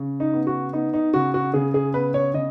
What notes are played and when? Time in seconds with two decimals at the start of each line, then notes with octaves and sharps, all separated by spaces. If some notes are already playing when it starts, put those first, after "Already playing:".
Already playing: C#3
0.20 D#4
0.33 B3
0.47 F#4
0.73 B3 D#4
0.94 D#4
1.14 C#3 F#4
1.34 F#4
1.54 C#3 G#4
1.74 G#4
1.94 B3 B4
2.14 C#5
2.34 C#3 D#5